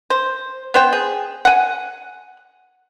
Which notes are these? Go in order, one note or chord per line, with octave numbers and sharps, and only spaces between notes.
C5
B3 C5 G5
G#4
F#5 G#5